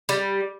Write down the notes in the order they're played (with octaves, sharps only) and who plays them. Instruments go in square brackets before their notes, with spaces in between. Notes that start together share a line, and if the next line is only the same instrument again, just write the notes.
[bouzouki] G3